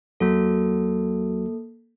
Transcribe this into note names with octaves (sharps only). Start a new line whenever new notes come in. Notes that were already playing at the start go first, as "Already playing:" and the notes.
E2 F#3 A#3 F#4 A4